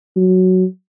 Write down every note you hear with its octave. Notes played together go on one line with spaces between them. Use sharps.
F#3